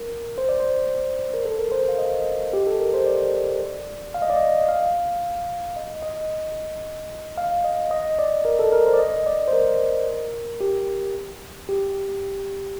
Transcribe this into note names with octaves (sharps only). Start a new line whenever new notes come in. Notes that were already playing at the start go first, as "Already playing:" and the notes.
Already playing: A#4
C5
D5
C5
A#4
A4
A#4
C5
F5
D#5
G4
A4
A#4
C5
D5
F5
D#5
D5
D#5
F5
D#5
D#5
F5
D#5
D#5
D5
A#4
A4
A#4
C5
D5
D#5
D5
C5
A#4
G4
G4